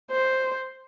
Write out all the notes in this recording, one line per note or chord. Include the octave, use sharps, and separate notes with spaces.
C5